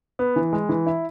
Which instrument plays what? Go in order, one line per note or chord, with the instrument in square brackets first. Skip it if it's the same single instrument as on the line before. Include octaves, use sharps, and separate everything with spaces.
[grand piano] B3
E3
G#3
E3
E4